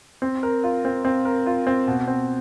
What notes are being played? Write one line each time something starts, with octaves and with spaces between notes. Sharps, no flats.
C4
A#4
F4
C4
C4
A#4
F4
C4
B2
C4